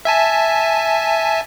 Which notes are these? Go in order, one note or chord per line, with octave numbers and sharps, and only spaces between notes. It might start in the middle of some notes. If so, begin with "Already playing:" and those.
E5 G#5 A5